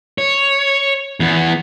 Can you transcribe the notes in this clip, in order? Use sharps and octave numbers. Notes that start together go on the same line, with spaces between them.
C#5
E2 B3